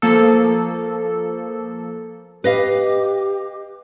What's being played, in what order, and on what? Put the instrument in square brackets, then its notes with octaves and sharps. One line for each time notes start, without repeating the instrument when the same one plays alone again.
[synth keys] F3 A#3 A4
[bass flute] G4 [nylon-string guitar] B4 D#5 F5